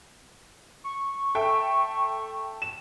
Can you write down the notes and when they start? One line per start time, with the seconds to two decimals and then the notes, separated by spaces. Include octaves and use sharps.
0.84 C#6
1.35 A4 E5 G5
2.62 E7